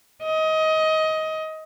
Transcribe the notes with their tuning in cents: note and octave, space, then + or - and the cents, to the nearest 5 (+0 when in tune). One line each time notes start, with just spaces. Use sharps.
D#5 +20